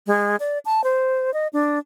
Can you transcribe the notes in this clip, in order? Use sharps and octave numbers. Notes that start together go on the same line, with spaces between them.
G#3
D5
A5
C5
D#5
D4